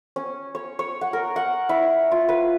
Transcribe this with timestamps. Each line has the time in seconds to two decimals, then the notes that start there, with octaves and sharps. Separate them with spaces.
0.16 C#4
0.55 C#5
0.79 C#5
1.01 F#5
1.13 A#4
1.36 F#5
1.69 E4
2.11 F4
2.29 B4